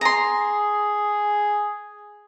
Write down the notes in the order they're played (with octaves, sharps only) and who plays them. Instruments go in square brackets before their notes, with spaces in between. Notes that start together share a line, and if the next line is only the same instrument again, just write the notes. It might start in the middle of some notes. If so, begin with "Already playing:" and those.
[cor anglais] G#4 [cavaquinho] A#5 C6